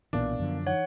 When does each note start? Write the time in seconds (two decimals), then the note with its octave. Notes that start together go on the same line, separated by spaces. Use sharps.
0.13 B1 A#2 E3 B3 D4 A#4 F5
0.39 F#2 D3 F3
0.67 E3 D#4 C#5 F#5